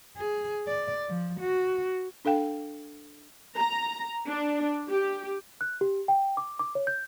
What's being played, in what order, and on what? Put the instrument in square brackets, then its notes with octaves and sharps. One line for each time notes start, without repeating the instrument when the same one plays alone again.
[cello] G#4
D5
F3
F#4
[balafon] D4 A4 F5 G5
[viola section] A#5
D4
G4
[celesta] F#6
G4
G5
D6
D6
C#5
G6